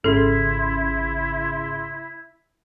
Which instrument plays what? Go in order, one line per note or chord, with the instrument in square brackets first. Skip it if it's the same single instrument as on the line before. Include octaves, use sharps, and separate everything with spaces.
[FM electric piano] G#1 C#3 C6 [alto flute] E4 [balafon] A4